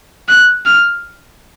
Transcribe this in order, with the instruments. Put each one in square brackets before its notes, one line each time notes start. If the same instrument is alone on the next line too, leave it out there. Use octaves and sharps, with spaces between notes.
[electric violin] F#6
F6